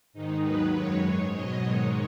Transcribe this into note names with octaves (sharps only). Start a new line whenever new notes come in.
G#2 D#3 G#3 D#4
D#2 D#3 F#3 B4
F#2 D#3 G#3 C#5
G#2 G#3
B2 F#3 D#5
G#2 D#3 G#3 C#5